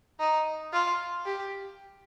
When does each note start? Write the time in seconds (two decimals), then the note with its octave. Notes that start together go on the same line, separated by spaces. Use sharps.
0.20 D#4
0.73 F4
1.26 G4